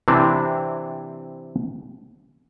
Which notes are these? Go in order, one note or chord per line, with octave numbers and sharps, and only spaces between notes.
C3 E3 C4 D4 E4